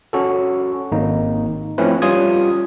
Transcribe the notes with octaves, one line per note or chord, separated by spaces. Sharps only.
C#4 F#4 A4
G#1 A#3 D#4
F3 A3 C4 C#4 E4 B4
G3 C#4 F4 D#6 G#6